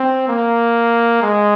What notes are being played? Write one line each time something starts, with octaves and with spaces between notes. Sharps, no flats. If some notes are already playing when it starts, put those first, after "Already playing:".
Already playing: C4
A#3
G#3